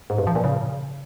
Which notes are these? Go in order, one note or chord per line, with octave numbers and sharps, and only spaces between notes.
G#2
G2
F3
A#2
C#3